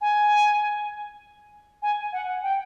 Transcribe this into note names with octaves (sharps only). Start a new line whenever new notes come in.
G#5
G#5
F#5
G5